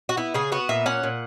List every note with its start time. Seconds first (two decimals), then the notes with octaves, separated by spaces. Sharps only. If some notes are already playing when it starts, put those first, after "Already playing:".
0.09 F#4
0.17 B3 E4
0.34 C#3 G#4
0.52 B3 F#4
0.69 A#2 E5
0.86 C#4 F#5
1.03 A#2